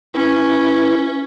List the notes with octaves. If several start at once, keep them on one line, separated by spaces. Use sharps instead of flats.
C#4 E4 B4